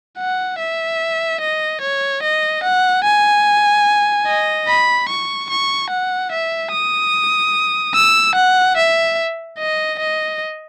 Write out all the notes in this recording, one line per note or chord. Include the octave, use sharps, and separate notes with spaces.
F#5
E5
D#5
C#5
D#5
F#5
G#5
D#5
B5
C#6
C#6
F#5
E5
D#6
E6
F#5
E5
D#5
D#5